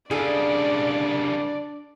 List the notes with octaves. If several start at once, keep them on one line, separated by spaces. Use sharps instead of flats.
C2 C#3 D4 G#4 A4 D5